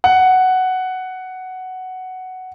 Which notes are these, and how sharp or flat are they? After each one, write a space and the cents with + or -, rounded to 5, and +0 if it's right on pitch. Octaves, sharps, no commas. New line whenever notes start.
F#5 +5